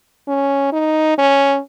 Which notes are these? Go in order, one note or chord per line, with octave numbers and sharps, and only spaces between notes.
C#4
D#4
C#4